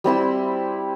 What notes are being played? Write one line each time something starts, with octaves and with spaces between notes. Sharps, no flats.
G3 C4 E4 E6